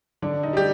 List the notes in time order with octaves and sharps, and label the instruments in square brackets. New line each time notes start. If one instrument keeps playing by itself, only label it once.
[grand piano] D3 [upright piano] D4
[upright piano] D#4
[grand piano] G3 [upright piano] G4